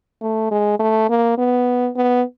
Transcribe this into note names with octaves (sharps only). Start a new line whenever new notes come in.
A3
G#3
A3
A#3
B3
B3